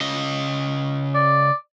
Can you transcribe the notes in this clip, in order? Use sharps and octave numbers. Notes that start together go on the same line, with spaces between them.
C#3 D#5
D5